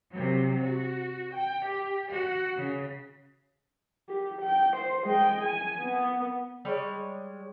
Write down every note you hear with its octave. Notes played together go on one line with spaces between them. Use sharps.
C3 F#3
F#4
G5
G4
F#4 F#5
C#3
G4
G5
C5
G#3 G5
G#5
B3
G3 G#3 C#5